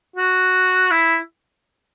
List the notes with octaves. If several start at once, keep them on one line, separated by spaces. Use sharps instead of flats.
F#4
E4